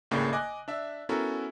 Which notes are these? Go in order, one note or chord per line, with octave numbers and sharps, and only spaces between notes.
G#1 A2 C#3 A#3 D4 G5
D#5 G#5 D6 F#6
D4 E5
B3 C#4 E4 F#4 A4 A#4